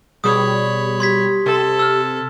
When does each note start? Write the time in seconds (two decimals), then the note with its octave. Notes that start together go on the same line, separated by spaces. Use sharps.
0.24 B2 G3 G#4 C#5 B5 D#6
1.00 G4 C6 G#6 B6
1.46 C3 A4
1.79 E6 F6